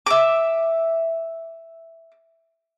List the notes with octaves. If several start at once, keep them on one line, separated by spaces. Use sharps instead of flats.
E5 D6